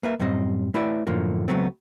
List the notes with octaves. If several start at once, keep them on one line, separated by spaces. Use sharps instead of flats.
A#3 B4 E5
F#2 A2 G3 C4 D#5
A3 E4 B4 D5 E5
F#2 A2 D3 F3 A#3
C#2 A#2 F#3 A3 B3 C4